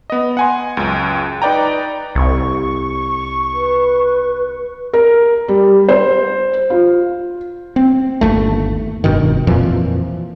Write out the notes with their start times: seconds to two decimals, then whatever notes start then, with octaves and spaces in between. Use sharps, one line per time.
0.10 B3 D#5
0.37 F#5 G#5 C6
0.77 C#2 F#2
1.42 D#4 B4 D5 G5 A#5
2.15 C2 C#6
3.54 B4
4.93 A#4
5.48 G3
5.89 C5
6.70 F4
7.76 C4
8.21 G1 D#2 A3
9.04 F1 G2 B2 D#3
9.47 F2 A#2 E3 F3